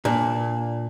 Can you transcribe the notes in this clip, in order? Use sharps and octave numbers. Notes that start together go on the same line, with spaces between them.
A#2 D4